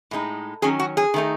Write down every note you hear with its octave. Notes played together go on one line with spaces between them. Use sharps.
A2 G#3 D#4
D#3 F#3 C#4 G#4
F#4
G#4
D#3 A3 D#4